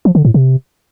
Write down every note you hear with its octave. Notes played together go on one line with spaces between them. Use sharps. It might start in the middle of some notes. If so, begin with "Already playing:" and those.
F3
D3
A2
C3